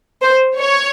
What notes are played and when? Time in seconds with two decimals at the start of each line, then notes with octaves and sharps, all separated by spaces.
0.22 C5
0.57 C#5